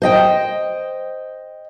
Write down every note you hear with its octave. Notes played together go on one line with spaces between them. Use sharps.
C5 D#5 G5